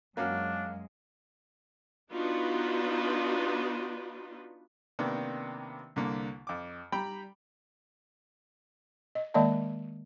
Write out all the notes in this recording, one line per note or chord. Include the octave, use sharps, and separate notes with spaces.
F#2 G#3 A#3 C#4 D4 F#4 F5 F6
B3 D4 D#4 F4 F#4 B4
C3 D#3 A#3 B3 D4
C2 D3 A#3
F2 D6
G3 G5 A#5 B5
D#5
D#3 G#3 A#3 D5 D#5 A5